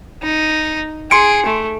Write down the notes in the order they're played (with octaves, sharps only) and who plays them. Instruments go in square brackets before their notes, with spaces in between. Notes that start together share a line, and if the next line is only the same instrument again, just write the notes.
[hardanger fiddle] D#4
[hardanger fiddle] G#4 [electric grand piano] C6 C#7 D7
[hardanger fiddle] A3